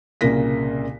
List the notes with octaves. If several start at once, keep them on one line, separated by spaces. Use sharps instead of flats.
C2 A#2 C#3 A#3 A#6 B6